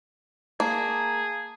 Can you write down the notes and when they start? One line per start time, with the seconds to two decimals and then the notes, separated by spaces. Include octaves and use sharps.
0.60 A#3 G#4 A5